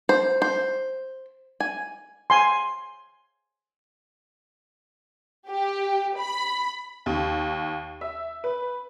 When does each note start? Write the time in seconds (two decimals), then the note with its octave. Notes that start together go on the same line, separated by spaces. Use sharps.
0.09 C5
0.42 C5
1.60 G#5
2.30 G#5 C6
5.49 G4
6.18 B5
7.06 D#2
8.01 E5
8.44 B4